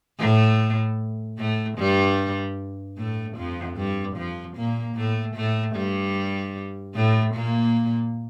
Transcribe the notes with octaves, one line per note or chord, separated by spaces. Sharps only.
A2 A3
A2 A3
G2 G3
A2 A3
F2 F3
G2 G3
F2 F3
A#2 A#3
A2 A3
A2 A3
G2 G3
A2 A3
A#2 A#3